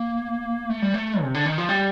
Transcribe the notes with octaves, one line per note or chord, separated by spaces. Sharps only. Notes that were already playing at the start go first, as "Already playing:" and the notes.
Already playing: A#3
A3
G3
A3
C3
D3
D#3
F3
G3